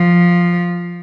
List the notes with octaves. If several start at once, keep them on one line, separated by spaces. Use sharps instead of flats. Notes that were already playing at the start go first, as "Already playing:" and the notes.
Already playing: F3